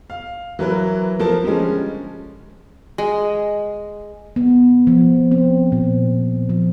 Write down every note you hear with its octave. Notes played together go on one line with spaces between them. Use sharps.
F5
E3 F#3 A#4 B4
F3 A#4 A5
D3 F3 G3 G#3 C#4
G#3
B3
F3
C4
A#2
F3